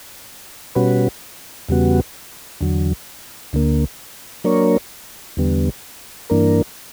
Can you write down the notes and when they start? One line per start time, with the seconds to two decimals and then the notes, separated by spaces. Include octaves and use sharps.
0.75 B2 G3 C#4 F#4 B4
1.69 E2 C#3 G3 B3 F#4
2.61 E2 D3 F#3
3.53 D2 D3 A#3
4.44 F#3 A#3 D4 A#4 C#5
5.37 E2 D3 G3 B3
6.30 G2 E3 A#3 D4 A#4